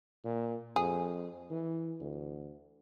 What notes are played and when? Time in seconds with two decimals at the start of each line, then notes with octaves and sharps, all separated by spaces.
0.24 A#2
0.76 F2 G#4
1.50 E3
2.01 D2